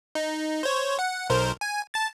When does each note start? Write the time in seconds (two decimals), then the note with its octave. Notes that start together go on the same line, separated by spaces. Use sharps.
0.15 D#4
0.63 C5 C#5
0.99 F#5
1.30 B1 A#4 C5
1.61 G#5
1.94 A5 A6